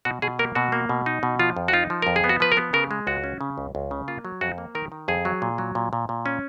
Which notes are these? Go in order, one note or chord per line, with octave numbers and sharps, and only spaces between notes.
B2 F#4
B2 G#4
A#3 A#4
B2 F#4
A#3
B2
D#4
B2
F3 F4
F2
F#4
D#4 F4
F3
F2 A#4
G#4
B3
F#4
F3 B4
A#4
B3
C#3 A#4
G#3
C#2 F#4
C#4
C#3
C#2
C#2
C#3
A#3 F4
F#3
F2 F#4
A#3
D#3 A#4
D#3
F2 G#4
F#3
A#2
F#3
A#2
A#2
A#2
C#4